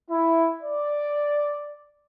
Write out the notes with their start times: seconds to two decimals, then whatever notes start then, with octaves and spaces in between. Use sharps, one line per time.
0.10 E4
0.63 D5